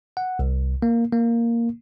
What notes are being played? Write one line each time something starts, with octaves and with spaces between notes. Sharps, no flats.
F#5
C2
A#3
A#3